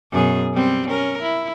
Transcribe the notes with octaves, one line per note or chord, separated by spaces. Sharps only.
F#2 B2 G#4
G3 C4
C#4 A#4
E4